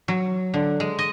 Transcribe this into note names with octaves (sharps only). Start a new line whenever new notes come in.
F#3
D3
G#3
D#5